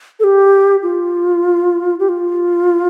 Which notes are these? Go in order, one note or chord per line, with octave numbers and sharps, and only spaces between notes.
A4
G4
F4
G4
F4